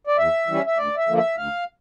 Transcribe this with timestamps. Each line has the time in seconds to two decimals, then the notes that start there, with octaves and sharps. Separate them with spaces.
0.07 D5
0.18 E2 E5
0.47 E3 G3 C#4
0.66 E5
0.77 D2 D5
0.97 E5
1.08 D3 F3 A#3
1.18 E5
1.37 D2 F5